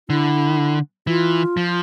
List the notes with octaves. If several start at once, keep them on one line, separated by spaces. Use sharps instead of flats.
D3 E4
E3 F4
F3